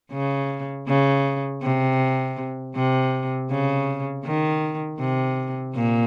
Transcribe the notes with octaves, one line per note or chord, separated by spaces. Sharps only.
C#3
C#3
C3
C3
C#3
D#3
C3
A#2